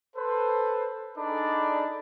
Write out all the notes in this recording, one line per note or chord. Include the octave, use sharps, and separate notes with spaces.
A4 B4 C5
D4 D#4 G#4 A4 D5 B5